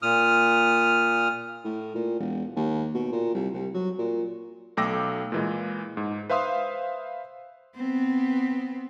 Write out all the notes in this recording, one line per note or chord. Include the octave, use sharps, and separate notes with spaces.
A#2 D#6 F6
A2
A#2
E1
D#2
B2
A#2
C2
C2
F#3
A#2
B1 A3 G5 D6 E6 A#6
A#2 E3 G#3
G#2
B4 C5 E5 F5 C6 D#6
B3 C4